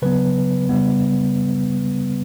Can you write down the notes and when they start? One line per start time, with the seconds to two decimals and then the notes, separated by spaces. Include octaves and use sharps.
0.02 C#3 F#3 B3 B4
0.69 C#3 G3 B3